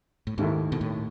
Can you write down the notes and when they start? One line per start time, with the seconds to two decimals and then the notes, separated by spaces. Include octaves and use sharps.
0.27 A2
0.38 D#2 G#2 D#3 A3 E4
0.72 B2
0.81 A2